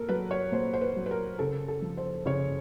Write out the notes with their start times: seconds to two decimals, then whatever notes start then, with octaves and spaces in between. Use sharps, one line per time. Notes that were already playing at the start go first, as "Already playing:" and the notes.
Already playing: A#2 A4 A#4
0.09 F#3 B4
0.31 C#5
0.52 A#2 C5
0.73 C5
0.81 B4
0.96 F#3
1.06 B4
1.11 A#4
1.39 C#3 A4
1.68 A4
1.82 F3
1.97 C5
2.26 C#3 C#5